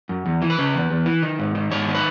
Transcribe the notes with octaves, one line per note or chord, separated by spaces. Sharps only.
F#2
E2
E3
B4
C#3
E2
E2
E3
D#3
G#2
D#3
G#2 C#5
D#3
B4